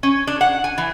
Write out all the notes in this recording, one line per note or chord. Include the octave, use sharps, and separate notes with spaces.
C#4
D4
F#5
G#5
E3